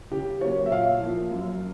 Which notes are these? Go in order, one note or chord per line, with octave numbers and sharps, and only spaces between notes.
C#3 G4
F#3 A#3 C#5
E5
A#2 F5
F3 A#3
F#2